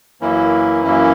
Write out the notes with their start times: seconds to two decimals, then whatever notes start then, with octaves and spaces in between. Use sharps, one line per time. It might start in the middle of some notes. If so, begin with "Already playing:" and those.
0.21 F#2 E3 A#3 C#4 E4
0.84 F#2 E3 A#3 C#4 E4